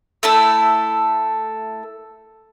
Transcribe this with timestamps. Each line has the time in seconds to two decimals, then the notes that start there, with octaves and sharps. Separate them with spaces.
0.23 A3 E4 A4